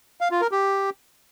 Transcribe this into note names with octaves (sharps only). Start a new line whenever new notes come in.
F5
F4
A#4
G4